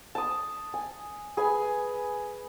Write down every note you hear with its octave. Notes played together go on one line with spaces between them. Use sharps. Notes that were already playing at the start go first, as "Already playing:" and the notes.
A5 D#6
G#5
G#4 B4 G#5